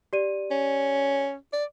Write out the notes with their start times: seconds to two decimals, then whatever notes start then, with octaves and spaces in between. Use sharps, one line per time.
0.13 G4 D5 D#7
0.51 C#4
1.53 D5